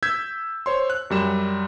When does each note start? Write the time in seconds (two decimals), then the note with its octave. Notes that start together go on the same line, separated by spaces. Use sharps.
0.03 E6 G6 G#6 B6
0.66 C5 C#5 C6
0.90 F#6
1.10 F#2 G3 E7